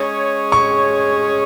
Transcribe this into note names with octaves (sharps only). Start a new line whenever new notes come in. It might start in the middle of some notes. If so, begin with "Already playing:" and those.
Already playing: G#3 C#4 G#4 C#5
C#6